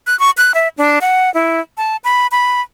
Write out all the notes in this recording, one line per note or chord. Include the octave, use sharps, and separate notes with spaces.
F#6
C#6
F#6
E5
D4
F#5
E4
A5
B5
B5